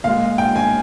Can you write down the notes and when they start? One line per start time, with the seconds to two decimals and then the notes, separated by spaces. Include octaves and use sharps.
0.04 A#2 G#3 F5
0.38 G5
0.56 G#5